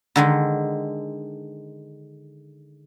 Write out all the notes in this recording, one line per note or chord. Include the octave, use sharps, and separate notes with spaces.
D3 D#3 G#3